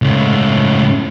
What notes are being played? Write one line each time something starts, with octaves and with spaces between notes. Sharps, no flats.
C#2 A2